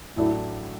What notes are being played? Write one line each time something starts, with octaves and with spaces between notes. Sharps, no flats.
A1 A2 F#3 A3 D4 E4